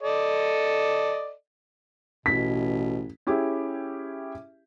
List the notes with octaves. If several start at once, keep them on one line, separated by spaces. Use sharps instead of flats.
A4 D5 D#5
A1 B2 B6
C#4 E4 G4 G#4 E5